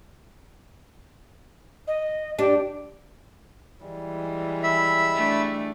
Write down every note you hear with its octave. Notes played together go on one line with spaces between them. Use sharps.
D#5
D4 G4
E3 G3 G#3
E5 B5
A3 D4